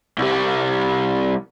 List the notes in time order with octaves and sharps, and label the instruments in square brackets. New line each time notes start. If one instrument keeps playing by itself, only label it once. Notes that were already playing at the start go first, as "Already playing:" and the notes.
[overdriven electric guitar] C2 G3